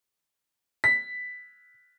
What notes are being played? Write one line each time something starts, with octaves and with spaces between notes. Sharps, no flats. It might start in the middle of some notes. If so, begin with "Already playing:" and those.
B6